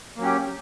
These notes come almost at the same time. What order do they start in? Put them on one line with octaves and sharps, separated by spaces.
A#3 F#3 C#4 G4